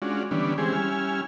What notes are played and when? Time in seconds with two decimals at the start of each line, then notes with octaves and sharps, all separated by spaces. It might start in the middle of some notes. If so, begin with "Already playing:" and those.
0.02 G#3 C#4 D4 F4 F#4
0.31 D3 E3 G3 B3 C#4 D4
0.58 E3 G#3 C4 C#4 G4 G#4
0.73 G3 C#4 E4 G#5 F6